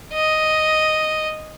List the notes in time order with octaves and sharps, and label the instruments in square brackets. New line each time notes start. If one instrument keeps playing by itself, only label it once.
[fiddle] D#5